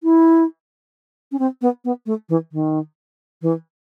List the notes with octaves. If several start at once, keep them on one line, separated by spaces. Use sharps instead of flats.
E4
C#4
C4
B3
B3
A3
E3
D#3
E3